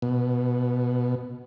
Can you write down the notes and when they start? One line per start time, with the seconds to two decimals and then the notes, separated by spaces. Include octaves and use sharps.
0.02 B2